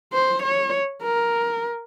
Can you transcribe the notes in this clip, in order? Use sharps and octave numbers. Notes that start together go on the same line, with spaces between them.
C5
C#5
A#4